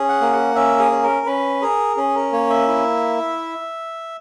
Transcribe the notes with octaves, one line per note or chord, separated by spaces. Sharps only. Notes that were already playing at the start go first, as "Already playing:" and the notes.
Already playing: C#4 G#4
F#5
A#3
F#5
C#4 E5
G#4
C#4
A#4
C#4 B4
G#4 A#4
C#4 G#4
A#4
A#3 C#5
E5
E4